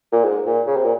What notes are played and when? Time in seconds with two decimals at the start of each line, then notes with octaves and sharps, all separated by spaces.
0.13 A#2
0.24 G#2
0.46 A#2
0.67 C#3
0.76 C3
0.84 A#2